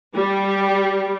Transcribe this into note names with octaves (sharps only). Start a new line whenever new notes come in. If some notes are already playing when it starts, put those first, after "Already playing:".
G3